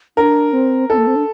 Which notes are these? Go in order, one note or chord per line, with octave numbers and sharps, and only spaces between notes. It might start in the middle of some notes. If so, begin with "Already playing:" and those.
D4 A#4
C4
C4 A4
A#3
C4
D4